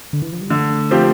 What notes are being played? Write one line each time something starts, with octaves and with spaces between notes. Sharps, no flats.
D3
E3
F3
G3
D3 A3
F3 C4 G4